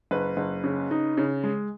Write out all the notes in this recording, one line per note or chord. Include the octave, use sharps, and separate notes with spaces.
F#1 B4
F#1
C#3
D#4
C#3
G#3